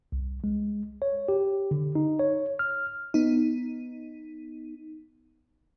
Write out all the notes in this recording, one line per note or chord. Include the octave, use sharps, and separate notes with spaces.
C2
G#3
C#5
G4
D3
D#4
C#5
F6
B3 D#4